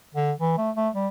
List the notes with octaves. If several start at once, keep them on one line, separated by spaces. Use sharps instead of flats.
D3
E3
A3
A3
G3